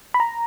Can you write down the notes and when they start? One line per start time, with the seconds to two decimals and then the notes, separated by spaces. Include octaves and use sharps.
0.14 B5
0.20 A#5